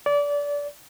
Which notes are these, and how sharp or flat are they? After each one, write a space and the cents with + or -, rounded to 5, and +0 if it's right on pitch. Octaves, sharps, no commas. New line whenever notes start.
D5 -25